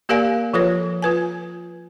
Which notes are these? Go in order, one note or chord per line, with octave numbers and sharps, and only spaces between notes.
A#3 G4 A#4 D5 F5 G#5
F3 F4 A4 B4 C#5
F4 B4 G#5